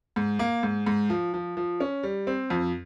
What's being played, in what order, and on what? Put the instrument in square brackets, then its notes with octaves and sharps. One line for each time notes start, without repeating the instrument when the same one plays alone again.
[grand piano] G#2
A#3
G#2
G#2
F3
F3
F3
C#4
G3
C4
F2